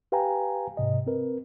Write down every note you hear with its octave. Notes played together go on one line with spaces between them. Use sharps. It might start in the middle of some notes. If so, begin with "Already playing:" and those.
G4 B4 F5 G5 G#5 A#5
G#2 C3 D#5
C4 A#4 B4